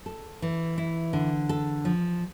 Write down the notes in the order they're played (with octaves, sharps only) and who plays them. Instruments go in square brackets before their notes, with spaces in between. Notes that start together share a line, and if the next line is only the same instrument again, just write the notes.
[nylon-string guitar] A4
E3
E4
D3
A4
F3